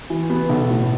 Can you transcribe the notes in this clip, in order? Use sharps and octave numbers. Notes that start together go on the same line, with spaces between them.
E3
B3
B1
A2